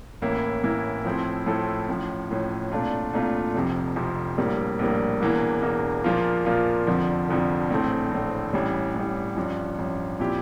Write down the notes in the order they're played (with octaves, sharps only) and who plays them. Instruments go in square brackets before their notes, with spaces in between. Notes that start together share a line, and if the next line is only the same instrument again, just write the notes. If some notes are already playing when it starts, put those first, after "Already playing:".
[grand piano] A1 A2 E3 A#3 E4
A1 A2 E3 A#3 E4
A2 F3 C4 E4 A4
A2 F3 C4 E4 A4
A1 A2 F3
A1 A2 F3
C2 A#2 A3 D4 F4
C2 A#2 A3 D4 F4
F1 F2 C3 F3
F1 F2 C3 F3
A#1 A2 G3 A#3
A#1 A2 G3 A#3
E1 E2 E3 A#3
E1 E2 E3 A#3
A#2 F3 A#3 F4
A#2 F3 A#3 F4
F1 F2 D3 F3
F1 F2 D3 F3
A#1 A2 E3 A3 C4
A#1 A2 E3 A3 C4
A1 A2 E3 G3
A1 A2 E3 G3
A1 G2 F3
A1 G2 F3
A#2 F3 C4 E4 G4